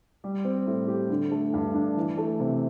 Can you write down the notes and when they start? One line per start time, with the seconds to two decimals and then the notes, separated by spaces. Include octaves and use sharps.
0.24 G3
0.45 C4
0.67 A2
0.88 G4
1.10 D3
1.31 A3
1.54 G2
1.74 D4
1.97 E3
2.17 A3
2.40 C3